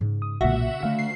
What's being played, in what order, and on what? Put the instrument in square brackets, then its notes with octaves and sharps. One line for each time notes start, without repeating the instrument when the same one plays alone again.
[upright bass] G#2 C#3
[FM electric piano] D#6
[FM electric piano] B1 A#2 [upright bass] D3 G#3 [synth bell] F#4 E5 F#5
[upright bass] C#3
[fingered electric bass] D3 A3 [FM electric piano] F5
[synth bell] C7